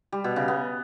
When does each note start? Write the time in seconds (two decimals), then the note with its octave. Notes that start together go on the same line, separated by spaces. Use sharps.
0.12 G3
0.24 B2
0.36 C#3
0.48 B3